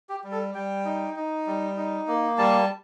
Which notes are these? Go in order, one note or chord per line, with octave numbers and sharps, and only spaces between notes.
G4
G3
A4
G3 G5
D#4
D#4
G3
D#4
A#3
G3 A5